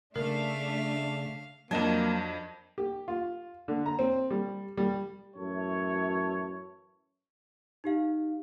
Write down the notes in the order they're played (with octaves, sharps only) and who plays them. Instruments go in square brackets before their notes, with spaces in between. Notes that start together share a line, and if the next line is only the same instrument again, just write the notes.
[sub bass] C#3 [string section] A3 D4 E5 [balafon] A#4 [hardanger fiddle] F5
[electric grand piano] F2 D#5 G#6 [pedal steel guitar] F#3 A5 [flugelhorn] A#3 [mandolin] D4
[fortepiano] G4
F4
D3
A#5
C4
G3
G3
[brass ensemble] F#2 A2 E3 A4 C#5
[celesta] D#4 G4 F5